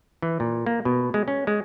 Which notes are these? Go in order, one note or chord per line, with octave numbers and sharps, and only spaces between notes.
E3
A#2
A#3
B2
G#3
C#4
G#3